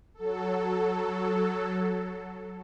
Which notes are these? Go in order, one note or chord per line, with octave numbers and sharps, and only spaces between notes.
F#3 A4